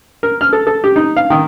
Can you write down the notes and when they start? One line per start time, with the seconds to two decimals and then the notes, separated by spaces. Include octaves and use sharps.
0.23 A#4
0.41 F6
0.53 A4
0.67 A4
0.84 G4
0.96 D#4
1.17 F5
1.30 D#3